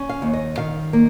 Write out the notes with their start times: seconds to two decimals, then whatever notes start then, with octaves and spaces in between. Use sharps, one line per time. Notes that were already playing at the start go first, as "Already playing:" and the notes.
Already playing: C#4
0.09 F5
0.22 D#2
0.34 D#5
0.58 D#3 F5
0.93 A#3